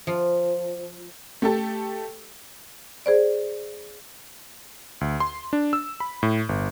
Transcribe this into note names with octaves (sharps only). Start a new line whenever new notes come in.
F3
A3 G4 A4
G#4 C5 D5
D2
C6
D4
E6
B5
A2
G1